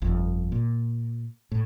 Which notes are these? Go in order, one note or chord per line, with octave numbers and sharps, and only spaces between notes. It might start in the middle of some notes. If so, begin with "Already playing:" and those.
G1 F2
A#2
A2